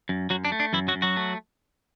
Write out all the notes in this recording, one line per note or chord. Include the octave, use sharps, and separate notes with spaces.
F#2
F#2 F#3 F#4
D4
A3
D4
F#2 E3 E4
F#3 F#4
F#2
F#3 F#4
A3